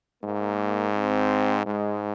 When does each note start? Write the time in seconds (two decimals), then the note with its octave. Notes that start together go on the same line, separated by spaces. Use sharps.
0.23 G#2 A#3
0.95 C4
1.66 G#2 G#3